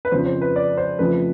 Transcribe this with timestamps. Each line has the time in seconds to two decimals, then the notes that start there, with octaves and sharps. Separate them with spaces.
0.05 B4
0.12 F2 C#3 F3 C5
0.26 C5
0.41 B4
0.56 D5
0.77 C5
0.99 F2 C#3 F3 A3 B4